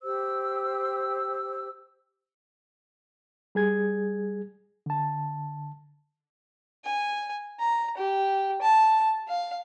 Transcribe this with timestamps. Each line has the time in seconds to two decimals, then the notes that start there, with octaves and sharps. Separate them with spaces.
0.02 G4 C5 E6
3.55 G3 G#4 G#6
4.86 D3 A5
6.85 G#5
7.60 A#5
7.97 G4
8.62 A5
9.28 F5